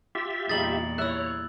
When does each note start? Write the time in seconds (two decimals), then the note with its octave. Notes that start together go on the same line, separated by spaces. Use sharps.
0.15 F4 G4 E5
0.49 E2 A#2 G3 D#4 G#4 A6 F#7
0.98 E4 C#5 E5 E6 F#6